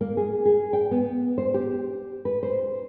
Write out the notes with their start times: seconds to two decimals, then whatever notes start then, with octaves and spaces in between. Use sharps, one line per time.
0.01 A#3
0.17 G#4
0.45 G#4
0.73 G5
0.91 B3
1.38 C5
1.54 G4
2.25 B4
2.43 C5